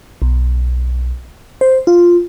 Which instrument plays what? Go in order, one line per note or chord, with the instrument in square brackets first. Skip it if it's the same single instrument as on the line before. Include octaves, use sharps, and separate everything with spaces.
[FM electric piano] B1
C5
F4